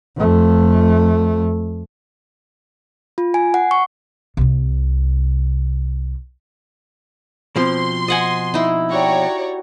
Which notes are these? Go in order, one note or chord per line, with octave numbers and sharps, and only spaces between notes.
F2 A3
F4
G#5
F#5
C#6
C2 C3
B2 F3 C4 C6
D#5 F#5 G#5
D#4 E4
F#4 G4 C#5 D5 A#5